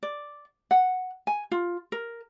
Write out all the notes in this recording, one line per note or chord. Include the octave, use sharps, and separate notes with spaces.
D5
F#5
G#5
F4
A#4